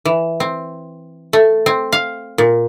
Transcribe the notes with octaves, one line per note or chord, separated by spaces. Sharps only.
E3
C4
A3
C4
F5
A#2